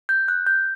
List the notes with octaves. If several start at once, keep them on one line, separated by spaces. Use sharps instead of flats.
G6
F#6
G6